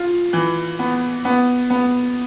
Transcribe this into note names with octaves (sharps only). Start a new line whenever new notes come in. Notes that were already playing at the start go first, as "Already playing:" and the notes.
Already playing: F4
E3
B3
B3
B3